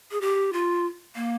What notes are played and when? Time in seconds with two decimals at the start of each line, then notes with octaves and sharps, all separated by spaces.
0.11 G#4
0.21 G4
0.53 F4
1.15 A#3